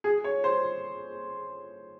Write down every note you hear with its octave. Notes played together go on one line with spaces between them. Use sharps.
G#4
C#5
C5